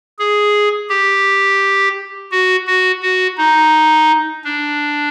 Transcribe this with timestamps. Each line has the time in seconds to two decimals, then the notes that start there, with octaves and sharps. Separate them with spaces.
0.19 G#4
0.90 G4
2.31 F#4
2.67 F#4
3.02 F#4
3.38 D#4
4.44 D4